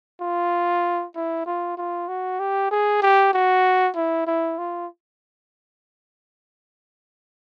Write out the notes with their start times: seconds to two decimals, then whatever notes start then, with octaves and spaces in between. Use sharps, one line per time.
0.21 F4
1.15 E4
1.46 F4
1.77 F4
2.08 F#4
2.39 G4
2.71 G#4
3.02 G4
3.33 F#4
3.96 E4
4.27 E4
4.58 F4